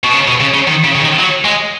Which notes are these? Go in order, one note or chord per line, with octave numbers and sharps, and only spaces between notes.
B2
C#3
B2
C#3
C#3
D#3
C#3
C#3
D#3
F#3
G#3